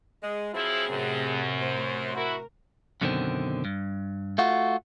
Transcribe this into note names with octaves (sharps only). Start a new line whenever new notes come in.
G#3
F3 F#3 C4 E4 G#4
F#2 A2 C3
C5
E4 F#4 A#4
F#2 B2 D3 D#3 C4
G2
A3 F4 F#4